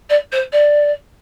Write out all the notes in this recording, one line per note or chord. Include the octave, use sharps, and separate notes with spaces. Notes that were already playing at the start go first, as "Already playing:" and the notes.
D5
C5
D5